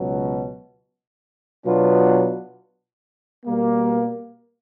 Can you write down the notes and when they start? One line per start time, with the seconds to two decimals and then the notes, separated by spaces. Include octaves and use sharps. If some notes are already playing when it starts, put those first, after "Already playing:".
Already playing: C#2 B2 F#3
1.65 B2 F#3 B3 D4 F4
3.45 B2 G3 A#3